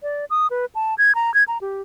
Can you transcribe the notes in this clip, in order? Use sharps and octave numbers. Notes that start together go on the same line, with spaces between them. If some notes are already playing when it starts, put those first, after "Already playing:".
D5
D#6
B4
A5
G#6
A#5
G#6
A#5
G4